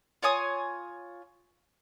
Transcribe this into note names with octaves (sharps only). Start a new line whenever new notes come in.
F4 C#5 G#5 D#6